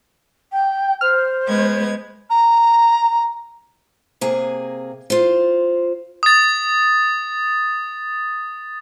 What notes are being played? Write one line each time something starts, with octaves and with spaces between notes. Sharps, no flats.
G5
C5 F6
G#3 B3 G#6
A#5
C3 A#3 G#4 G#5
F4 C5
D#6 A6